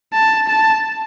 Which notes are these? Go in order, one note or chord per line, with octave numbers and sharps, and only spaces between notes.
A5
A5